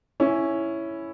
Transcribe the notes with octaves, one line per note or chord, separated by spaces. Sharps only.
C#4 E4